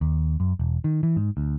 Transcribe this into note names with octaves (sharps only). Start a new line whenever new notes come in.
D#2
F#2
E1
D#3
E3
G#2
D2